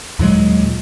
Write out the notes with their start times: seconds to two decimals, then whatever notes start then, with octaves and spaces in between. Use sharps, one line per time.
0.19 D#2 A#2 F#3 G#3